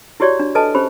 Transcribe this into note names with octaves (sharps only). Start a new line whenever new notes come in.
E4 F#4 G4 C#5 D5
D4
A4 B4 D#5 G#5 A5
C#4 G4 C5 B5